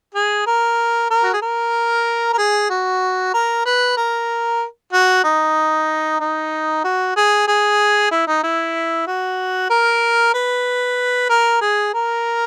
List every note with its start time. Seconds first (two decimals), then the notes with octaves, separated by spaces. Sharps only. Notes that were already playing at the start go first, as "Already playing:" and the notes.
0.15 G#4
0.47 A#4
1.10 A#4
1.23 F#4
1.33 G#4
1.42 A#4
2.33 A#4
2.38 G#4
2.70 F#4
3.34 A#4
3.65 B4
3.97 A#4
4.93 F#4
5.24 D#4
6.20 D#4
6.84 F#4
7.16 G#4
7.47 G#4
8.11 E4
8.27 D#4
8.43 E4
9.07 F#4
9.70 A#4
10.34 B4
11.29 A#4
11.61 G#4
11.94 A#4